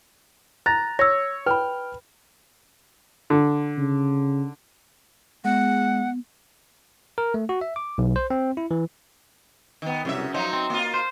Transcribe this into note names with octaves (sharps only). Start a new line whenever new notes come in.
A#5 F#6 A6 A#6
C#5 E6 A#6
B4 G5 B5 F6
D3
C#3
G#3 B3 F#5
A#4
A3
F#4
E5
D6
B1
C5
C4
E4
E3
D#3 B3
C2 F#2 C#3 E5
F3 F#3 D#4
C4
A#3 F4
C5